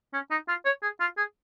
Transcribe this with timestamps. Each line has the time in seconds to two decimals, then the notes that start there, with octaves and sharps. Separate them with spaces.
0.13 C#4
0.31 D#4
0.48 F4
0.65 C#5
0.82 G#4
1.00 F4
1.17 G#4